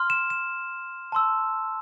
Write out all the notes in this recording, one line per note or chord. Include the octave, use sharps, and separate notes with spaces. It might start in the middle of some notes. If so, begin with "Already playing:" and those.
Already playing: C6 F6
E7
E7
A5 C6 E6